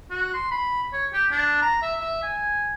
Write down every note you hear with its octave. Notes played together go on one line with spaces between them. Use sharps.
F#4
C6
B5
C#5
G4
D4
A#5
E5
E5
G#5